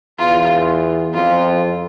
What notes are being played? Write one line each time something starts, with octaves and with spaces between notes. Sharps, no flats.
E2 F4
F2 F4